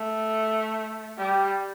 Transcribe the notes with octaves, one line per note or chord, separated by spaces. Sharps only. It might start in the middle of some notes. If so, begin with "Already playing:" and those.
Already playing: A3
G3